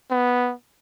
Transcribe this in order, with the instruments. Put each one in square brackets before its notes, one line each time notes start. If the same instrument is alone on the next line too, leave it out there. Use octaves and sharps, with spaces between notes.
[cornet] B3